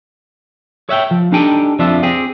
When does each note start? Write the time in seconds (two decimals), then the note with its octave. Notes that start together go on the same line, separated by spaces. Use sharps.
0.89 C#5 E5 F#5 G5
1.11 F3
1.32 D4 D#4 G4 A4 G5 G#5
1.79 F2 F3 D4 F4 E5
2.03 C4 G4 G#4